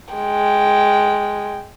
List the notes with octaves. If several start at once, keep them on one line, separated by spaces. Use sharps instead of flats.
G#3 G5